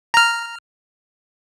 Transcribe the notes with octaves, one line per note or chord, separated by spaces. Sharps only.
A#5 F6